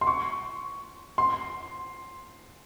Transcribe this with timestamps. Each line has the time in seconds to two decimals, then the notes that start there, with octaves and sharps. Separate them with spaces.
0.01 C6
0.07 C#6
1.18 C6